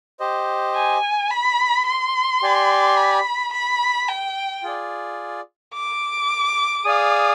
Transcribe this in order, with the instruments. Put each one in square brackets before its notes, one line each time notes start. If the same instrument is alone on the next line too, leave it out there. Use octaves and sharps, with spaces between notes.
[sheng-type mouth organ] G4 C5 D#5
[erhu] G#5
B5
C6
[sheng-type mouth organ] G4 D5 G#5
[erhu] B5
B5
G5
[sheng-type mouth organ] F4 G#4 D5
[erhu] D6
[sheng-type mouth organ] G#4 D5 F5 [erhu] D#6